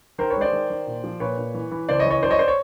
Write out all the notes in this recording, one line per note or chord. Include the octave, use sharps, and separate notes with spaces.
D#3 A#4 C5
B4 C#5
G#3 C5 D5
D#3
D#3
A#2
F3
A#2 B4 C#5
A#2
E3
E3
C#2 C5 D5
C#5 D#5
E3
C#5 D#5
F#2 C5 D5
C#5 D#5
C5 D5
C#5